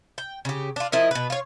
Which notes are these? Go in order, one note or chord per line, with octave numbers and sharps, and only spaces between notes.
G5
C#3 G4
D4 F4
F3 E4 A#4 D#5
B2 B4
F4 C#5